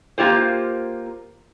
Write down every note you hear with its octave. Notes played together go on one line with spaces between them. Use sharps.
A#3 F4 G4 C5